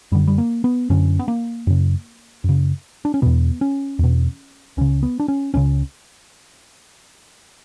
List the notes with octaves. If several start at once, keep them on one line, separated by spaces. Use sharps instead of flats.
F#2 D3 G3
G3
A#3
B3
F#2 D3 C#4
B3
A#3
F#2 C#3
F#2 C#3
D4
C#4
E2 B2 B3
C#4
E2 B2
C#2 C#3 C#4
B3
D4
C#4
C#2 C#3 C#4